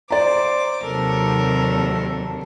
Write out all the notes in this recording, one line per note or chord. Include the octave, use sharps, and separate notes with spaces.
C5 D5 A#5 D6
D#2 C3 F#3 A4 A#4